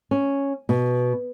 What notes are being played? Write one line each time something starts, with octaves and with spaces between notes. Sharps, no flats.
C#4
B2